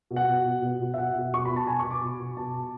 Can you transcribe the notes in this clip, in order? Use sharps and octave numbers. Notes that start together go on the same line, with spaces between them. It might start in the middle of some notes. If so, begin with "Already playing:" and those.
B2
F#5
B2
B2
B2
B2
E5
B2 F#5
B2
B2 C#6
B2 B5
A5
B2 G#5
C#6
B2
D6
B2
B2
B2 A5
B2